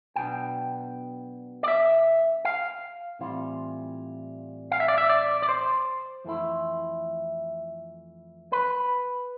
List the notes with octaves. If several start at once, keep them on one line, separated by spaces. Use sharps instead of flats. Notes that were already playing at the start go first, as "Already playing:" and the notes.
B1 B2 B3 D4 G5
D5
E5
F5
A2 E3 G3 C4 F4
F5
E5
D5
E5
D5
D5
C5
F2 E3 A3 E4
B4